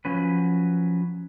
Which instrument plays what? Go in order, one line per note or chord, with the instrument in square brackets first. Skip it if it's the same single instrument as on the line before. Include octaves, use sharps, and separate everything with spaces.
[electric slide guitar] F3 F#3 C#4 B4